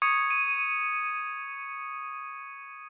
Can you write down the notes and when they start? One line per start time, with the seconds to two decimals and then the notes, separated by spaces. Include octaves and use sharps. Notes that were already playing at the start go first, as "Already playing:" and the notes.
0.02 C#6 D#6 G#6 C#7
0.31 D#7